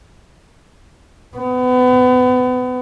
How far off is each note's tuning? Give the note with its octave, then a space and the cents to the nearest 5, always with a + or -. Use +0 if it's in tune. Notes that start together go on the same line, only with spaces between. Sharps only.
B3 +30